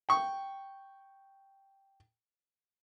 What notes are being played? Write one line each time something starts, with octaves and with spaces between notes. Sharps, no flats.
G5 C#6